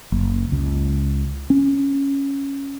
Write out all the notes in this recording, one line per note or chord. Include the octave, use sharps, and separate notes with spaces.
F#1
C#2
C#4